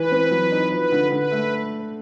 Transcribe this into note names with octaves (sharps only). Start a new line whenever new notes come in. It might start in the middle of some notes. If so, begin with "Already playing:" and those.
Already playing: E3 B4
C4
F#3
D#4
F3 B4
D3
D3 B4
A3